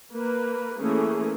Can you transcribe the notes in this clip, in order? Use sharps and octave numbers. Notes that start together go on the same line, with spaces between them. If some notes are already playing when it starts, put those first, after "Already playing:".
A#3 B4
E3 A3 A#3 C#4 G#4